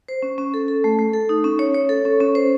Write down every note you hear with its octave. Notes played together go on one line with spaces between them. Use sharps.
C5
C#4
C#4
A4
A4
A3
A3
A4
D#4
C#4
C#5
C#5
A4
C#4
C#4
C5